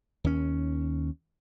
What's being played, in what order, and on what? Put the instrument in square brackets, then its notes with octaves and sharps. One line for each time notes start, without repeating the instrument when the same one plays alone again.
[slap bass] D#2 C#4